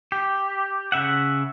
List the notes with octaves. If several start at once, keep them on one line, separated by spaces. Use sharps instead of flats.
G4
C#3 E5 F#5